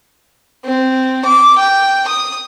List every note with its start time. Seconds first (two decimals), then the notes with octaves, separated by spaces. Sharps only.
0.65 C4
1.25 D6
1.58 G5
2.08 D#6